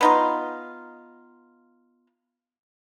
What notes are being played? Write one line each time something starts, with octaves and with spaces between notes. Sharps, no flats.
B3 D#4 F4